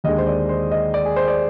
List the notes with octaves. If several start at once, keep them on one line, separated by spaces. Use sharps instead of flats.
D#2 D3 G#3 D#5
C5
D5
C5
D#5
D5
G#4
C5
D5